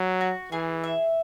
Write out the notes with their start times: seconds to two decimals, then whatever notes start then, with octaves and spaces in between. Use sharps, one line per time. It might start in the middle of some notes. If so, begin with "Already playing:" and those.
Already playing: F#3
0.21 F#4
0.52 E3 G#4
0.84 E5